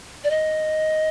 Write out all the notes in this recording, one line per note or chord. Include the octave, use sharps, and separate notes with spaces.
D5
D#5